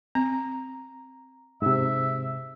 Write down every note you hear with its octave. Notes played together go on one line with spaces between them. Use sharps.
C4 A#5
G#2 C3 E5